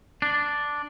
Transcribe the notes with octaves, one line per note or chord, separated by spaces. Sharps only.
D4